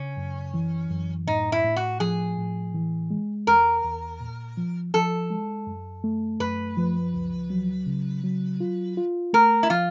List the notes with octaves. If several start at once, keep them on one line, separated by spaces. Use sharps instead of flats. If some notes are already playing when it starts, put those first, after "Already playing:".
Already playing: C#3 C#4
F#2
E3
F#2
A2 D#4
E4
A2
F#4
F3 G#4
A2
E3
G#3
E2 A#4
E2
A#2
F3
F3 A4
G#3
F#2
A3
F#2 B4
F3
C#2
F#3
C#3
F#3
F4
F4
A3 A#4
E4
F3 F4